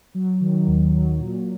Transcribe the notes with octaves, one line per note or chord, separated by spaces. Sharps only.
F#3
D#3
D#2
F#3
A#2